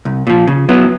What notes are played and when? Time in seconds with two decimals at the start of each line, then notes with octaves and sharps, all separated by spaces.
0.05 C2
0.27 A#2 F3
0.47 C#3
0.69 F#3 B3 E4